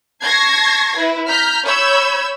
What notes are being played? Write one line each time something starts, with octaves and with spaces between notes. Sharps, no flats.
A5 C#6 G#6 A#6 C7
E4 B4
A#5 F6 G6 B6
C#5 B5 E6 G6 G#6